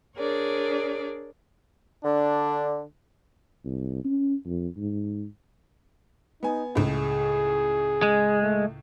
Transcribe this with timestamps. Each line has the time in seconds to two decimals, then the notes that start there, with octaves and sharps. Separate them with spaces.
0.17 D4 G#4 A#4 C#5 D5
2.04 D3 D4
3.65 C2
4.04 C#4
4.46 F2
4.77 G#2
6.43 B3 D#4 G#5
6.75 C#2 A2 G#4
8.03 G#3
8.42 A3